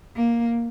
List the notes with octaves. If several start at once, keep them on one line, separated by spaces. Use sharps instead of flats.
A#3